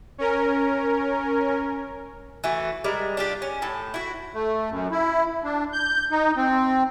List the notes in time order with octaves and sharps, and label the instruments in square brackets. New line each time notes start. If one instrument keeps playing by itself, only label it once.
[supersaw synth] C#4 A#4
[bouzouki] E3 A3 F#4
G3 G#3 A#4 D5
D4 F4 G4
C#4
A2 A4
E4 F#4
[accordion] A3
F#2
E4
D4
G6
D#4
C4